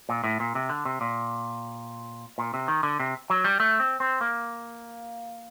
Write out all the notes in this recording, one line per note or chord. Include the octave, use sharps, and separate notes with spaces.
A#2
A2
A#2
C3
D3
C3
A#2
A#2
C3
D#3
D3
C3
F#3
G3
A3
C4
C4
A#3